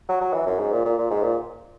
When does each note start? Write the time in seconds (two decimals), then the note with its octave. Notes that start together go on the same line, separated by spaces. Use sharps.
0.09 F#3
0.21 F#3
0.33 E3
0.46 F#2
0.59 G#2
0.72 A#2
0.85 A#2
0.98 A#2
1.10 G#2
1.22 A#2